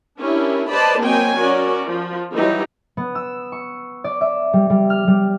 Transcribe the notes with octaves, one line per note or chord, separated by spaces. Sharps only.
C#4 D4 E4 G4 A#4
B4 C5 D5 D#5 A5 B5
F#3 A#3 C4 D#5 G5 G#5
C#4 F#4 A#4 D5
F3
E3 F#3 G3 D#4 G4
B3
E6
C#6
D5
E5
G3
G3
F6
G3